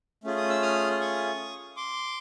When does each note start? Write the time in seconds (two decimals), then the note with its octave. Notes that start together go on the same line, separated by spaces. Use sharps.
0.24 A3 C#4 F4 G#4
0.37 D#6
0.50 E6
0.62 D#6 F6
1.01 C#6 D#6
1.76 C6 D6